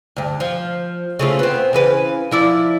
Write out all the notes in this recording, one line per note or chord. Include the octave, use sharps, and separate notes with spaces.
D2 G2
F3
C#3 A3 F4
B3 C4
C#3 E3 B4
F3 E4 D5